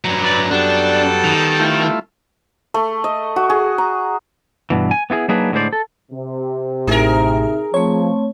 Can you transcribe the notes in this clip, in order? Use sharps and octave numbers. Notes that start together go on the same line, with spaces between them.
G2 F#3 A#5
B4 D5
F#2 G3 B3 D4 A4 F#5
D#3
A3 E4 F4
A3
D#5
F#4
G#4
A#5
G2 B2 E3
G#5
B3 E4 F4 G#4
F#3 A#3 D4 D#4 G#4 B4
A2 D3 G#3 B3 C5 D5
A4
C3
A1 A2 D#4 G#4 A#4 E5
F3 A3 C4 C#5